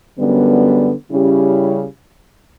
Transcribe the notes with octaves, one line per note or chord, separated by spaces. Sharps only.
F#2 D3 G3 B3
C#3 G3 C#4 E4 G4